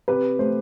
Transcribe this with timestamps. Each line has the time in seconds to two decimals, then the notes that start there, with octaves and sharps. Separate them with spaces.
0.08 C3 G4 B4
0.39 A3 C5